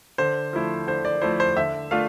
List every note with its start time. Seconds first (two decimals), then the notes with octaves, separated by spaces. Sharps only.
0.18 D3 C5
0.53 F3 A3 E4
0.87 D3 C5
1.05 D5
1.22 F3 A3 E4 C5
1.40 C5
1.57 D3 E5
1.91 A3 D4 F4 F5